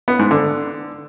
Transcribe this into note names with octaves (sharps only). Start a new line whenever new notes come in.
B3
G#2
D3